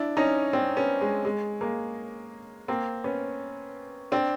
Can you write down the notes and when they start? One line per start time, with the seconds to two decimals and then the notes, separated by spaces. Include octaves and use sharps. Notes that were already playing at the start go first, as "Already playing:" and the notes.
Already playing: D4 E4
0.17 C#4 D#4
0.53 C4 D4
0.77 B3 C#4
1.01 G#3
1.25 G#3
1.61 G#3 A#3
2.68 A#3 C4
3.04 B3 C#4
4.12 C4 D4